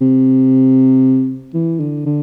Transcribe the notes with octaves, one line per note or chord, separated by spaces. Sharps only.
C3
E3
D3
D3